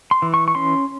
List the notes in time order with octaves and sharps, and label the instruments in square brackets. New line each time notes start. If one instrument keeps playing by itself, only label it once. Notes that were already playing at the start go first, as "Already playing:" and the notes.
[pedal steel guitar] C6
E3
C#6
C#6
C#4 C6